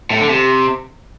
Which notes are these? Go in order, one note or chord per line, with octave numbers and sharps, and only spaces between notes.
A2
D3
C3